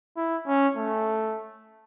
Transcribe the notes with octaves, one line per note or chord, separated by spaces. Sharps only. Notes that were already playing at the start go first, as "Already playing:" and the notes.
E4
C#4
A3